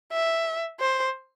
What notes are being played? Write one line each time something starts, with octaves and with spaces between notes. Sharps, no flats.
E5
C5